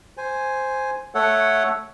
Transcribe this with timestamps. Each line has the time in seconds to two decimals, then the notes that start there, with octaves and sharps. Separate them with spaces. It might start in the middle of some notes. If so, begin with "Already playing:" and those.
0.17 C5 G#5
1.15 A3 A4 C#5 F#5